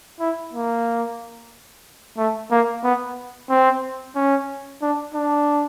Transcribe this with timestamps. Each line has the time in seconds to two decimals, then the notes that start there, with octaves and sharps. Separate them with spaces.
0.20 E4
0.53 A#3
2.17 A3
2.51 A#3
2.84 B3
3.50 C4
4.16 C#4
4.82 D4
5.15 D4